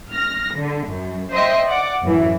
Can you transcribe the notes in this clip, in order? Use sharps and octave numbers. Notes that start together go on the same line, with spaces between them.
F6 A#6
D3
F#2
C5 D#5 E5 G5
D5 F#5 D6
F#2 A2 E3